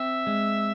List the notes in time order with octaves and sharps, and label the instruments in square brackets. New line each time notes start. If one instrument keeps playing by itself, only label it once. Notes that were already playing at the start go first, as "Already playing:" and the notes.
Already playing: [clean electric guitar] C4 [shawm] E5
[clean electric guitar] G#3